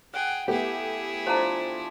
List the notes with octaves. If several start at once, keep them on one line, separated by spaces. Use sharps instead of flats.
G#4 F#5 G5
A3 B3 E4 G4 G#4
F3 D4 C5 A#5